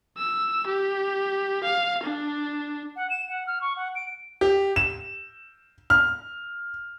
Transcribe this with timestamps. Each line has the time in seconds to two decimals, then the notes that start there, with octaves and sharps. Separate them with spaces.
0.18 E6
0.66 G4
1.64 F5
2.03 D4
2.96 F#5
3.10 E7
3.29 F#5
3.47 F6
3.61 C#6
3.76 F#5
3.95 D7
4.41 G4
4.76 E7
5.90 F6